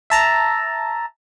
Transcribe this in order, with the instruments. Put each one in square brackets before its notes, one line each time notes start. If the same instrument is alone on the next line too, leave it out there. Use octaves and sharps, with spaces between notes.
[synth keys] E5 A5 A#5